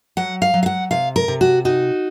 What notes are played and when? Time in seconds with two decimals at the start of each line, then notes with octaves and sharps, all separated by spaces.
0.17 F#3 F#5
0.42 F5
0.54 F#3
0.63 F5
0.66 F#5
0.91 C3 F5
1.16 A#4
1.28 C3
1.41 F#4
1.65 D#4 F#4